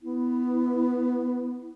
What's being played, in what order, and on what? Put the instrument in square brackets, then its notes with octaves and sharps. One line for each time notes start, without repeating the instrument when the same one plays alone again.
[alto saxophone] B3 [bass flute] E4